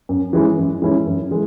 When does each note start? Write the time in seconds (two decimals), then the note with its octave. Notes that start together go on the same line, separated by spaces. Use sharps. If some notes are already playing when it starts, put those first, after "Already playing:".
0.09 F#2
0.33 E3 G#3 C#4 E4
0.58 F#2
0.82 E3 G#3 C#4 E4
1.06 F#2
1.31 E3 G#3